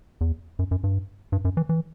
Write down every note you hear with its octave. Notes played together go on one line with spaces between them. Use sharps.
E2
F#2
F#2
G2
G2
F#2
E3
E3